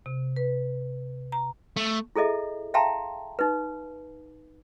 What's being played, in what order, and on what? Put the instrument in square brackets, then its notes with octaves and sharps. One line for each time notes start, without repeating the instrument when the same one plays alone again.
[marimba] C3
B4
A#5
[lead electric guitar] A3
[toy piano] E4 G#4 A4 D#5 E5
E5 F5 G5 A5 A#5 C6
D#4 B4